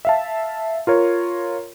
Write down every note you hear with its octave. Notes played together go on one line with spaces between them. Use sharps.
E5 F5 A5
F4 A#4 C#5